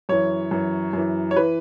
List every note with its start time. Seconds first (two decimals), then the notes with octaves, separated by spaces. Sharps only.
0.09 F#2 E3 C#5
0.51 F#2 E3
0.93 F#2 E3
1.31 C#5
1.36 E3 B4